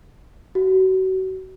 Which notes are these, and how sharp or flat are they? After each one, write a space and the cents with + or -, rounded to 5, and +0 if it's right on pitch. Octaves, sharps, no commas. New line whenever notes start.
F#4 +30